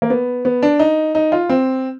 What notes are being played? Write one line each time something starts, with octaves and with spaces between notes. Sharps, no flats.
A#3
B3
B3
D4
D#4
D#4
F4
C4